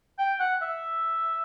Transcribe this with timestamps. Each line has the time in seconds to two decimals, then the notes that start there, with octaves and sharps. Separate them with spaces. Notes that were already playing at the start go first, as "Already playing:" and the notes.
0.18 G5
0.40 F#5
0.62 E5